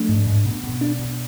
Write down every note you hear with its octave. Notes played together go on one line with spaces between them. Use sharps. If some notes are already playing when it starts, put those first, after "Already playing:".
Already playing: F3 A3 D4
G#2
G#2
B2
B2
D4
B2